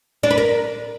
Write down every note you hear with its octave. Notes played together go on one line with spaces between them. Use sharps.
D4
B4
A#4